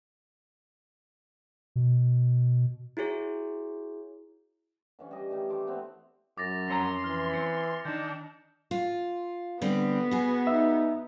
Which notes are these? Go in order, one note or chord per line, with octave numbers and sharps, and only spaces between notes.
B2
E4 F#4 G#4 C#5
D3 E3 C#4
G3 D#5
D#3 E3 G3 A3
A3 G5 C6 D6
A3 B3 C4
F#2 D6 A6 A#6
F2 C#4 A#5 C6 E6 G#6 A#6
E3 F6
C4 C#7
D#3 D4 D#4 G6 E7
F4
D3 G3 B3 C4
F#4 G#4
D#4 E5